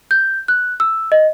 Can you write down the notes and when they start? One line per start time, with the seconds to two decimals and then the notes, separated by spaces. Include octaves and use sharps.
0.11 G6
0.48 F#6
0.80 E6
1.12 D#5